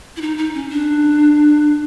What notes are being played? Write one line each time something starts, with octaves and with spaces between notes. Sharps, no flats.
E4
D#4
D#4
C#4
D4